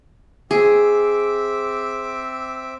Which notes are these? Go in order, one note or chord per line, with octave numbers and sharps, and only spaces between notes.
C4 G#4 E5 D6